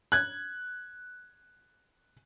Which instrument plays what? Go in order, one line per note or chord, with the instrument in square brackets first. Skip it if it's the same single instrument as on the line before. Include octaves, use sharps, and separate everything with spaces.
[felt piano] F#6 G#6